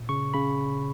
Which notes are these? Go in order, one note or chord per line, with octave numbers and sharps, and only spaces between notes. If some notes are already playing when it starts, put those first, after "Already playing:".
Already playing: A#2
C#3 C#6
C#3 B5